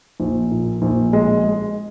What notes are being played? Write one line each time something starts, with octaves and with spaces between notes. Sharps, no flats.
A#1
A#2
A#1
G#3
G#3